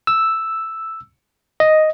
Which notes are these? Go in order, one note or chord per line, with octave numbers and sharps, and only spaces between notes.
E6
D#5